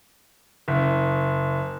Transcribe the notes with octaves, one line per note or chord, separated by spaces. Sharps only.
F#1